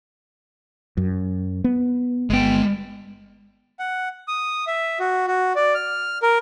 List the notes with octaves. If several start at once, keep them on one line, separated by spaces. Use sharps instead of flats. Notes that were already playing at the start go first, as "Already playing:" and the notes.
F#2
B3
G1 G#3 B3 G5
F#5
D#6
E5
F#4
F#4
D5
F6
A#4